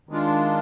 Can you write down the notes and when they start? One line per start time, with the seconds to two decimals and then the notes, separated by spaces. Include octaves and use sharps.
0.09 D#3 G#3 D4 F4